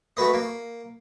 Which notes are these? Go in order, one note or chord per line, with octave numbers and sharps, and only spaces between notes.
A3 F#4 B4 D#5
A#3